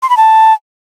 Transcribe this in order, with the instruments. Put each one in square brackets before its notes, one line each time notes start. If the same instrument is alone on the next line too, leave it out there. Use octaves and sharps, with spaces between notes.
[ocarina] C6
B5
A5